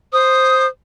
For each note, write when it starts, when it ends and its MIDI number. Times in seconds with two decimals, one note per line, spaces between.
0.13 0.68 72
0.13 0.66 87